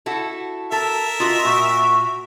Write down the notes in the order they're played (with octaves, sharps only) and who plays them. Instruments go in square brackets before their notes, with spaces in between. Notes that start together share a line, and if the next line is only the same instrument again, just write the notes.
[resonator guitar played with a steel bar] E4 F#4 A4
[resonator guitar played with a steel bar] A4 [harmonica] A#4 E5
[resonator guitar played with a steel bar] F4 F#4 [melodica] D#5
[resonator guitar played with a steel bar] A#2 [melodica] F#4